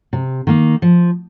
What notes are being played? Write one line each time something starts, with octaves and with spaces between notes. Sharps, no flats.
C3
D#3 A#3
F3